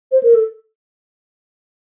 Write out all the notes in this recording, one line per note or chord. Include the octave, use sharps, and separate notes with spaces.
C5
A#4
A4